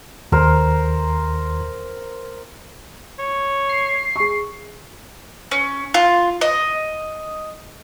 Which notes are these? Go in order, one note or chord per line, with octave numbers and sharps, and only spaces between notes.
D#2 A#4 C5
C#5
C7
G#4 C#6
C#4
F4
D#5